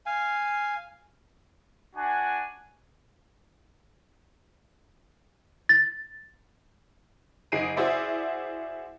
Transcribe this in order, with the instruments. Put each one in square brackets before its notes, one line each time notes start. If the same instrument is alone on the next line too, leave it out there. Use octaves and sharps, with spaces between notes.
[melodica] F5 G#5
[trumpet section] D4 F#4 G#5
[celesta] A6
[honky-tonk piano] F#1 D#4 G#4 C7 D7 D#7
E4 F#4 G#4 C5 D5 E5